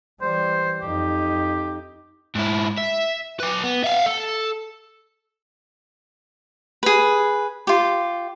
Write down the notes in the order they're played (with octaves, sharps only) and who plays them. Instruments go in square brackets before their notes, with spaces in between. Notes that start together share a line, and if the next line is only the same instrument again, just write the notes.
[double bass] E3 G3 [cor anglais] C5
[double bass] F2 D#4 [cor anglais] G4
[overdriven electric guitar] G#2 E4
E5
F#3 B4
B3
E5 F5
A4
[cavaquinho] G#4 B4
F4 G4